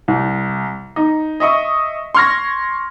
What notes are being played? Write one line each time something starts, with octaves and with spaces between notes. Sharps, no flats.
C2
D#4
D#5 E5 C#6 D#6
C6 C#6 F6 G#6 A#6